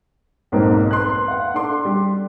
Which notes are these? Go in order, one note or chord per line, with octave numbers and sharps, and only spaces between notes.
B1 F2 G#2 A#3 C5
B4 C6 F#6
F5 F#5
D4 A4 C6 D6
G3